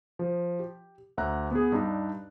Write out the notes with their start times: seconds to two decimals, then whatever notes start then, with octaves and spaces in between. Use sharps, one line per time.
0.19 F3
0.59 G4
1.17 D2 E5 F#5 A#5 F#6
1.51 B3 G#4
1.72 G2 D4 D#4